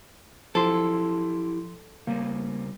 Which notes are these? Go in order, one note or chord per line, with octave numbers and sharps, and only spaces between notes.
F3 E4 G4 A4 C6
C#3 G3 A#3